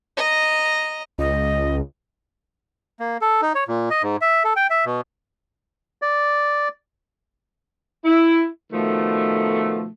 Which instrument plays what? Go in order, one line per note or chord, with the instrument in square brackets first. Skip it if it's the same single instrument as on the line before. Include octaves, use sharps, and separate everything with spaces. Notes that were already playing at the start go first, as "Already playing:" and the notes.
[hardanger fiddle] D#5 A#5
[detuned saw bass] C#2 [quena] D#5
[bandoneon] A#3
A4
D#4
C#5
A#2
D#5
G#2
E5
A4
G5
E5
B2
[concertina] D5
[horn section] E4
B2 D#3 F3 A3